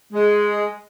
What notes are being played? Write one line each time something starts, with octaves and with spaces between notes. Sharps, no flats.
G#3